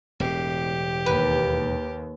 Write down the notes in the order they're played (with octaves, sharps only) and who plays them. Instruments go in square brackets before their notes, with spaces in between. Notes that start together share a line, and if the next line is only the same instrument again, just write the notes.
[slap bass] E1 A2 [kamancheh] G4
[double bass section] D#2 [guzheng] B4